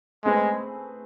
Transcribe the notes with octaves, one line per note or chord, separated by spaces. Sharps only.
G#3 A3 C4 G#4 B4